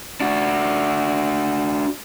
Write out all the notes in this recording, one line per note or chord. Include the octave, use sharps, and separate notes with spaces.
D4 F#4